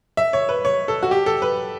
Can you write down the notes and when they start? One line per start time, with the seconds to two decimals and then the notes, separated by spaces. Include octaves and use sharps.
0.17 E5
0.33 C#5
0.49 B4
0.65 C#5
0.88 A4
1.03 F#4
1.11 G4
1.26 A4
1.42 B4